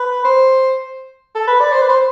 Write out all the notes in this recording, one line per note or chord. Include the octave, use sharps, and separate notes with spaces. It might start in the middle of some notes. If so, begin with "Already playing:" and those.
Already playing: B4
C5
A4
B4
D5
C5
B4
C5